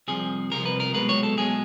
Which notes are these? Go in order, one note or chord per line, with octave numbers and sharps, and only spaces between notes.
C2 C3 F3 G#4
C2 C3 F3 A#4
B4
A#4
B1 B2 G#3 B4
C#5
A4
B1 B2 G#3 G#4